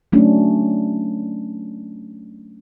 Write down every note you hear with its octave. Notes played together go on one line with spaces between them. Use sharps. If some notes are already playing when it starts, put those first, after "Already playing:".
F#3 A3 C#4 D4